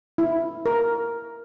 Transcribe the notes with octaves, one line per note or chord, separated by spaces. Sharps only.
E4
A#4